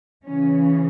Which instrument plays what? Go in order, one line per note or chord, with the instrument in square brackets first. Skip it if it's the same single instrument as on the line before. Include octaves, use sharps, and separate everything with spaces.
[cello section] C#3 E3 C#4